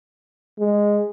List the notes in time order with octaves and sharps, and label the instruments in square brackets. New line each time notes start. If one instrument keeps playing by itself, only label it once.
[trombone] G#3